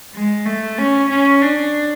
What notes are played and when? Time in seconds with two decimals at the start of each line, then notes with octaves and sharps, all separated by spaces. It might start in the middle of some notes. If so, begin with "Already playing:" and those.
0.15 G#3
0.46 A3
0.78 C#4
1.10 C#4
1.42 D4